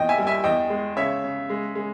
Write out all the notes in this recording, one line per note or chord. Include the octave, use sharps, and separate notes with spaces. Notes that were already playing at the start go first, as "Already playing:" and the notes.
Already playing: E2 A#2 D#5 G5
E5 G#5
G3
E5 G#5
E2 D#5 G5
G#3
C#3 C#5 E5
C#3
G#3
G#3